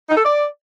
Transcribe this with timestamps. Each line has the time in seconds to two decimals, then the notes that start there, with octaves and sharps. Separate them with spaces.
0.09 D#4
0.17 A4
0.24 D5